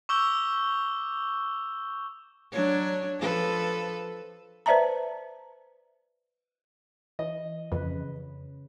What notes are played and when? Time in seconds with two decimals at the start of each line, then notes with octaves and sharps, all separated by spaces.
0.09 C#6 D6 E6 G6 G7
2.52 F#3 D4 C#5
3.19 F3 A4 B4
4.66 B4 C5 D5 E5 A5 A#5
7.19 E3 D#5
7.72 F2 C#3 B4